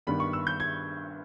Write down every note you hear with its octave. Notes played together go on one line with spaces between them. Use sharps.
G2 D#3 G3 B3 B5
C#6
E6
G6
G#6